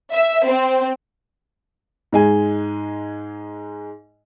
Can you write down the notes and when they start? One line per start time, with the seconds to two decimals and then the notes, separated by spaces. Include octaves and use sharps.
0.12 E5
0.46 C4
2.12 G#2 G#3 G#5